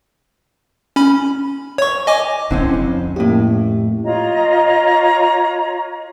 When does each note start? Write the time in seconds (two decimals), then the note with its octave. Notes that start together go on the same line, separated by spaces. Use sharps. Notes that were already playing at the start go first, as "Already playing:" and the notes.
0.96 C#4 B5
1.78 C#5 C#6
2.07 D#5 G#5 D6
2.51 D3 C4 C#4 E4
2.74 F2
3.16 F2 A2 A#3 C#4 G4
4.04 F4 C#5 D#5 A#5